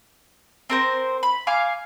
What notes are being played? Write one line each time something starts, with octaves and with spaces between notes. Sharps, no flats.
C4 A#4 C5
B5
F5 G#5 D6 F6